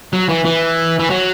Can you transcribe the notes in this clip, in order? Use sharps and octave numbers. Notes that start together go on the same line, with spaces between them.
F#3
E3
E3
E3
F#3